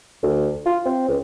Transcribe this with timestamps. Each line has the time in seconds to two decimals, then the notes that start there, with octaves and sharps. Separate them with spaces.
0.23 D2
0.65 F4
0.85 C4
1.08 C#2